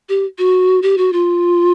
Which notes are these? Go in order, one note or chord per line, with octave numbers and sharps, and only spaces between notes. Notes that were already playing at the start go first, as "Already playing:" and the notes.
G4
F#4
G4
F#4
F4